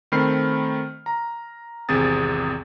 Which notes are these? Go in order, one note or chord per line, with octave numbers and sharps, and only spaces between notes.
D#3 A3 C4 B5 F6 C7
A#5
G#1 E2 C3 G#4 D#6 A6